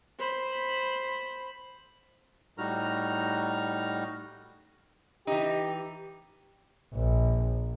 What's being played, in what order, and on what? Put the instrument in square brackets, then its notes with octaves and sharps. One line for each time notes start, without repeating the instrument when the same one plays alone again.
[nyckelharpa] C5 B5
[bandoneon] A2 G3 D#4 F#4 A#5 F6
[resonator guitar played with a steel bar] E3 D#4 [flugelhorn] G4
[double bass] A#1